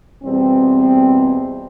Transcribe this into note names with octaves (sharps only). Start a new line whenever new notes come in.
E2 B2 G3 C4